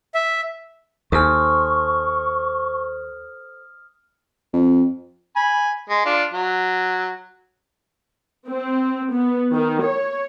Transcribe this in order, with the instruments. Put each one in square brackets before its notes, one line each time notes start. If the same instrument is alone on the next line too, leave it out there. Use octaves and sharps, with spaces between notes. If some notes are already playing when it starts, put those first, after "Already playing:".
[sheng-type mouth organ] E5
[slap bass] D#2 [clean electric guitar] A4 C5 G#5 [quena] C#6 [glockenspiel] D#6 F6
[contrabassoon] F2
[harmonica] G#5 B5
G#3
D4 F4
F#3
[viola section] C4
B3
D#3
C#5